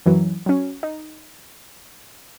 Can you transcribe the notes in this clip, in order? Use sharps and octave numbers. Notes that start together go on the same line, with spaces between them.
F#2 E3 F#3
F#3 C#4
D#4